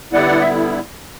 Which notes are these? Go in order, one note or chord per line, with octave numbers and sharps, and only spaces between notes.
D3 G3 B3 E4 D5 F#5
E5